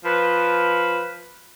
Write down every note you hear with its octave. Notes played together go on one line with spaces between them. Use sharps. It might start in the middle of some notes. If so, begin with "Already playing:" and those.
F3 B4